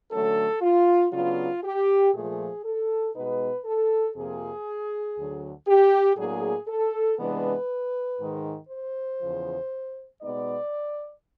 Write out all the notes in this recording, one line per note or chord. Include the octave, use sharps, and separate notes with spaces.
D3 F#3 A3 C#4 A4
F4
C#3 F#3 B3 D4 F4
G4
A#2 F3 A3 G#4
A4
B2 G#3 B3 D#4 B4
A4
F2 C3 F3 A#3 G#4
D2 D3 F#3
G4
A2 F#3 A#3 D4 G#4
A4
C3 E3 G#3 B3 D4 B4
G#2 D#3 G#3
C5
E2 C#3 F3
B2 G#3 B3 D#4 D5